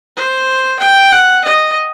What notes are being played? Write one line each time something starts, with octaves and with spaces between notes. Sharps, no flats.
C5
G5
F#5
D#5